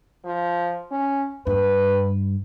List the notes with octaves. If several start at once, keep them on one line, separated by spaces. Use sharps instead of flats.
F3
C#4
G2 B4